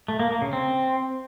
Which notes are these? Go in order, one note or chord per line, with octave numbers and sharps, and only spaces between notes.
A3
A#3
A#3
C#3
C4